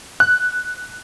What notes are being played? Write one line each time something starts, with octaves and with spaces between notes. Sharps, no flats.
F#6